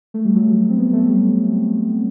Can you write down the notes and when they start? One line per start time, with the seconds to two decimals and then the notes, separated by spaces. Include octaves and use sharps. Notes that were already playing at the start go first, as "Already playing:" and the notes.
0.14 A3
0.25 G3
0.36 F#3
0.46 G3
0.70 C4
0.78 B3
0.93 A3
1.09 G3